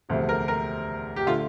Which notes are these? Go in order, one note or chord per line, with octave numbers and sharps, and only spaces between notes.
E1 D2 C3 F3
A#4
A#4
G4
D3 A3 F4